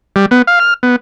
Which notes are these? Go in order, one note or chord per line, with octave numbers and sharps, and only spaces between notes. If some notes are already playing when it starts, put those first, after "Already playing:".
G3
B3
F5
F6
B3